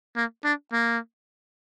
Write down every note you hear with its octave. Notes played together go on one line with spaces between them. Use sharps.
A#3
D4
A#3